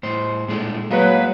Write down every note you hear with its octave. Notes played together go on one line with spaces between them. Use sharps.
A2 C5
A#2 G#3 A3
F#3 G#3 A#3 F#4 B4